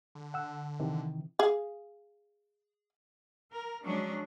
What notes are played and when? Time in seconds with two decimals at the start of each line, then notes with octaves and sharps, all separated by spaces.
0.15 D3
0.34 F#5 E6
0.80 C3 D#3 E3
1.39 G#4 F5
3.53 A#4
3.84 F3 F#3 G#3 C#4 D4